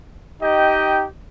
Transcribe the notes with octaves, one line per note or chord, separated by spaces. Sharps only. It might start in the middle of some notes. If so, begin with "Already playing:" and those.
D#4 G4 D#5 G5